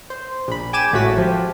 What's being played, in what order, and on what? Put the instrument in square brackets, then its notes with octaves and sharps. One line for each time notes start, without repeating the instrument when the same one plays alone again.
[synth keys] C5
A#1 B5
G5 G#5 D6 D#7 E7
G#1 A2 A3 F#4 B6
F3 G4